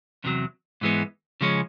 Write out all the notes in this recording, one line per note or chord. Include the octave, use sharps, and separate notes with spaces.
E2 C3 D#3 F#3
G#2 E3 G#3 B3
C#3 F3 G#3 C#4